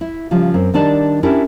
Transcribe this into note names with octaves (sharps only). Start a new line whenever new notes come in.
E4
C#3 F3 G3
F#2 C4
D#3 G3 D4 D#4 D5 A5
C#4 D4 E4 G4 A#4 E5